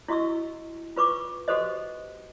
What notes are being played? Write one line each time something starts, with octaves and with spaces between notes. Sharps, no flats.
E4 F#4 D#5 C#6 E6
F4 B4 C#6 D6
F#4 G4 A4 B4 C5 D#5